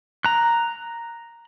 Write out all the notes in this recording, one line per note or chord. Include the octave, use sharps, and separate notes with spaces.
A#5 F#6